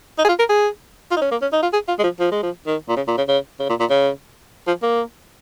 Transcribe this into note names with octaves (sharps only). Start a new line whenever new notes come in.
D#4
G#4
F4
A#4
G#4
F4
D#4
C#4
A#3
C#4
D#4
F4
G#4
F4
G#3
F3
F3
G#3
F3
D#3
A#2
C#3
A#2
C#3
C#3
C#3
A#2
A#2
C#3
F3
A#3